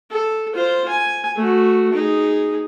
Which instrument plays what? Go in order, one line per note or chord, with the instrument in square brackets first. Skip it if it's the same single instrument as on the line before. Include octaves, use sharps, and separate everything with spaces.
[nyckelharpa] A4
F4 C5
G#5
A3 F#4
D#4 G#4